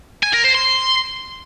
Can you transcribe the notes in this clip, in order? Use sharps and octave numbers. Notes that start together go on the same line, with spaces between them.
G#5
A#4
C5
C6